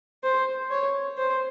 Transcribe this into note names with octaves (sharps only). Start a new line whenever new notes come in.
C5
C#5
C5